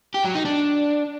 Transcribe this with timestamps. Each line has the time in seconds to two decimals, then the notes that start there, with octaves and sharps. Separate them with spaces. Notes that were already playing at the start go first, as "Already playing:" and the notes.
0.15 G4
0.25 F#3
0.35 D#4
0.45 D4